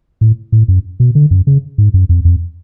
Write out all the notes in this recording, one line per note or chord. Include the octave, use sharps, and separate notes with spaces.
A2
A2
F#2
B2
D3
F#2
C#3
G#2
F#2
F2
F2